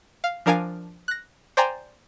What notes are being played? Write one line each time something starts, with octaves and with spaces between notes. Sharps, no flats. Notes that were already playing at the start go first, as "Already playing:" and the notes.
F5
F3 D4 A#4 F5 G#5 D#7
F#6 A#6
C5 D5 G5 G#5 A#5 C6